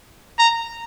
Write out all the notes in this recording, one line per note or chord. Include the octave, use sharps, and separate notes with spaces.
A#5